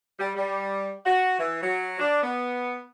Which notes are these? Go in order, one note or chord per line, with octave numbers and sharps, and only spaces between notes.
G3
G3
F#4
E3
F#3
D4
B3